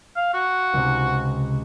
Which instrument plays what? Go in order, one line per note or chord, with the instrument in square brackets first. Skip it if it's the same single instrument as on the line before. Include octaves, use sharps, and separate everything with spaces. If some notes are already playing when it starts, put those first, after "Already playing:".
[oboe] F5
F#4
[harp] C#2 C3